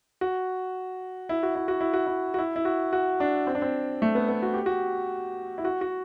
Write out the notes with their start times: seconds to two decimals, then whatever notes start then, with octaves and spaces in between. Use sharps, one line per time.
0.21 F#4
1.29 E4
1.43 F#4
1.55 E4
1.68 F#4
1.81 E4
1.93 F#4
2.07 E4
2.34 F#4
2.38 E4
2.56 E4
2.65 F#4
2.93 F#4
3.20 D4
3.47 C4
3.55 D4
3.62 C4
4.02 A3
4.15 B3
4.29 B3
4.42 F#4
4.54 G4
4.66 F#4
5.58 E4
5.65 F#4
5.81 F#4